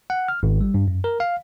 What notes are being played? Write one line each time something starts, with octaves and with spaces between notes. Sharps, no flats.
F#5
F6
G#1
G3
G2
F#2
A#4
F5